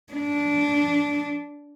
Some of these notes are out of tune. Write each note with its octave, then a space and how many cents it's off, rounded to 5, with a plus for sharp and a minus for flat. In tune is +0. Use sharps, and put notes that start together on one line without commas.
D4 -15